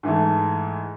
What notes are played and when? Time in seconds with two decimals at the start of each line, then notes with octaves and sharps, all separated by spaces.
0.03 G#2 E3 A3